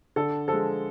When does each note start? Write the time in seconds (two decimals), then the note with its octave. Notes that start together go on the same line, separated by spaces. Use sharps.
0.16 D3 A4
0.48 F3 G#3 A4